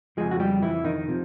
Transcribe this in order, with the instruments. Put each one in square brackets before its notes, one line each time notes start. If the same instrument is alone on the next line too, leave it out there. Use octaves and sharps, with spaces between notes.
[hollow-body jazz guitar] F2 C#3 F3 G#3 G#4
F#4
G3 G4
E3 E4
D#3 D#4
C3 F3